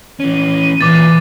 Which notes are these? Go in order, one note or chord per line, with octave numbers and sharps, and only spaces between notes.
E3 C#4 D#7
A#2 E3 D6 A6